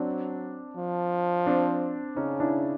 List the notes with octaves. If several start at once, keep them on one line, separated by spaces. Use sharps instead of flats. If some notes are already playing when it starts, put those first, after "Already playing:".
Already playing: F#3 C4 D4
F3
C4 D4
C#3 C#4 D#4
D4 E4